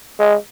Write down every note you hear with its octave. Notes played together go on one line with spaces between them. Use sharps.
G#3